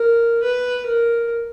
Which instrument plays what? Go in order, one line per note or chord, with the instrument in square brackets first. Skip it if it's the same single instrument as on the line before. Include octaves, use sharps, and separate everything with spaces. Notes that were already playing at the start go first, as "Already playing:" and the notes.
Already playing: [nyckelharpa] A#4
B4
A#4